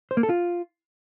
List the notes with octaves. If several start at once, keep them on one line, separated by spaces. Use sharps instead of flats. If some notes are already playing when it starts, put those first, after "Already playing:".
C5
A#3
A4
F4